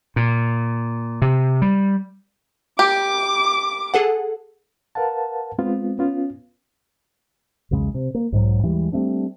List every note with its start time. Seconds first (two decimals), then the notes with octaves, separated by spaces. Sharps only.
0.16 A#2
1.22 C3
1.62 G3
2.79 G4 D6
3.94 G#4 A4 F#5
4.95 A#4 B4 F5 F#5 A5
5.59 G#3 B3 C4 F4
5.99 B3 C#4 F4
7.71 B1 E2 C#3 G#3
7.94 C3
8.14 A#3
8.32 B1 G#2 D#3 F#3
8.63 D#2 E3 G3 G#3
8.92 G3 A3 C4 D4